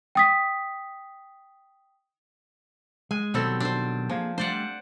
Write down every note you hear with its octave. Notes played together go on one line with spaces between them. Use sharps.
G5 D#6 B6
G#3 G#5
B2 D#3 F#3 G3 C4 A4
D4 C5
F3 A#3 G#4 A5
G3 A3 D4 C5 D5 F#5